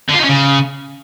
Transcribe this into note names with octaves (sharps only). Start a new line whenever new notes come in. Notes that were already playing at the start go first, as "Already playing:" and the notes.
D3
F4
D#4
C#4
C#3